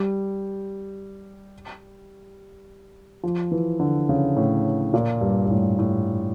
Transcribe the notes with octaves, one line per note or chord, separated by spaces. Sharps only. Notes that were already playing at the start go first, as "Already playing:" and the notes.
Already playing: G3
F3
E3
D3
C#3
A2
A#2
G2
G2
A2
A2